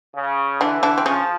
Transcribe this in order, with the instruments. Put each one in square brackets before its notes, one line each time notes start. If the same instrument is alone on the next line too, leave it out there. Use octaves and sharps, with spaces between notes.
[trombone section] C#3
[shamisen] D3 D4 [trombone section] E3
[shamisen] D3 D4
C4
[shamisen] C#3 C#4 [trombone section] F3